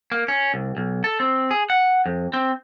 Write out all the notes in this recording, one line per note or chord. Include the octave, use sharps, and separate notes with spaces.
A#3
C#4
C2
B1
A4
C4
G#4
F#5
F2
C4